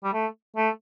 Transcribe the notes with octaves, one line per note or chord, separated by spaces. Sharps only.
G3
A3
A3